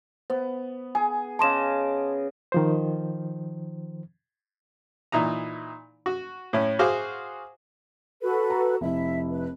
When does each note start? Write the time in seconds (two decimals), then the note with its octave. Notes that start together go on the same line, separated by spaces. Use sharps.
0.30 B3 C5
0.95 G#4 G#5
1.39 C#3 D#5 A5 C6 D6 E7
2.52 D#3 F3 C5
5.12 A#2 E3 D#4 A#5
6.06 F#4
6.53 A2 C#4
6.79 F#4 G#4 C5 F5 D6
8.22 F#4 A4 B4
8.50 A#5
8.81 F1 E4 E5
9.31 B4